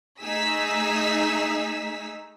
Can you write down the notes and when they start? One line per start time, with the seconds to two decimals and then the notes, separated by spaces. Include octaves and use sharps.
0.21 A3 D#4 G#4 E6 B6